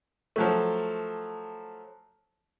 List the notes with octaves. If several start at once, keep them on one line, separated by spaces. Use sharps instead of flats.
F3 F#3 A3